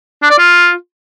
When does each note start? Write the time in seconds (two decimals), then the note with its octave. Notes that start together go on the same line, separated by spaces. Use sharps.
0.23 D4
0.31 D5
0.39 F4